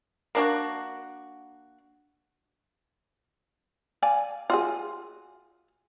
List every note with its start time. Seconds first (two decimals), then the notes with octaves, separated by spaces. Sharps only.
0.35 A#3 D4 F#4
4.03 D5 F5 G#5
4.50 F4 F#4 G#4